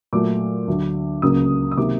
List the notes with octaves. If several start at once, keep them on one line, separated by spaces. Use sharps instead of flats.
A#2 F#3 A3 D6
D2 D3 F#3
C#2 C#3 F#3 A#3 D#6
D#6
C3 D#3 F#3 A#3 D6